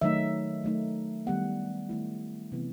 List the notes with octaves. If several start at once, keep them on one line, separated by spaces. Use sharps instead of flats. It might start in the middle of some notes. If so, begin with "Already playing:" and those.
D#3 F#3 A3 D#4 E5
F#3 A3 D#4
D#3 G3 B3 F#5
D#3 A3 E4
C3 E3 B3